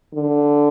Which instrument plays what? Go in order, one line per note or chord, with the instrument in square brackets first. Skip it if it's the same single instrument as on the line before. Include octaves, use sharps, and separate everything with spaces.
[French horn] D3